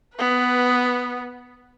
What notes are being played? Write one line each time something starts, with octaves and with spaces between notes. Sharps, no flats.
B3 B4